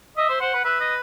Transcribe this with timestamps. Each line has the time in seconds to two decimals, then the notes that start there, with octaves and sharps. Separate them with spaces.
0.17 D#5 E5
0.29 C5
0.41 C5 F#5
0.54 B4
0.65 B4 E5
0.80 D#5